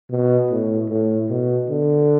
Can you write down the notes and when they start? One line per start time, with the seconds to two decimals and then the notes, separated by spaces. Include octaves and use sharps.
0.10 B2
0.50 A2
0.90 A2
1.30 B2
1.69 D3